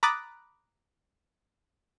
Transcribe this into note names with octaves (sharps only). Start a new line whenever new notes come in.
A#5 B5 D6 D#6 F#6 A6